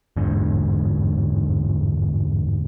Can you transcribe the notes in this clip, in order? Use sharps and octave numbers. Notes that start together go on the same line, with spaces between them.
G1 E2 G#2 D3